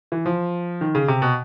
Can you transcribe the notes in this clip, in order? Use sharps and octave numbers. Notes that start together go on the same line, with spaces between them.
E3
F3
D#3
C#3
C3
B2